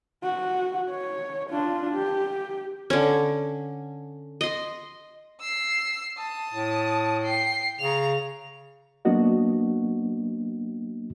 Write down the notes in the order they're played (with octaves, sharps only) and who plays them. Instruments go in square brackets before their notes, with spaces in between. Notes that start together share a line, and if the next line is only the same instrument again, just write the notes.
[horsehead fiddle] F#4
C#5
D4 F4
G4
[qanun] D3 C#4
D#5 C6
[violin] E6 C7
A5 D#6
[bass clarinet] A2
[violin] G5 C7
[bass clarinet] C#3 [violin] A#5 F7
[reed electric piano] F#3 A#3 B3 D4 F#4 D#5